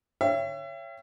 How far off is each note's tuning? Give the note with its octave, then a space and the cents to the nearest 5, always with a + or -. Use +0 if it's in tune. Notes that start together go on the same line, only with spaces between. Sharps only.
C#5 +0 E5 +35 G5 +0